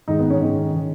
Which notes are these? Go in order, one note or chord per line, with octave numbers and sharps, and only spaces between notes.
G#2 D#3 D#4
B3
C#4
G#2 D#3
D#3